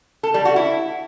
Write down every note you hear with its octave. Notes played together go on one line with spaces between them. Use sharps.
A4
G3
F#4
E4